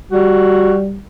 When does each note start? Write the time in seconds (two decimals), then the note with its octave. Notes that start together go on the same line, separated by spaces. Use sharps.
0.12 G3 F#4